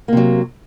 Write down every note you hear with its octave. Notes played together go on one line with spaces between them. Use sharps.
C3 F#3 A#3